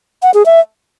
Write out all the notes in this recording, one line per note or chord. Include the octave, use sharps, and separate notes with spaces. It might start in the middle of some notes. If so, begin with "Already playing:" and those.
F#5
G#4
E5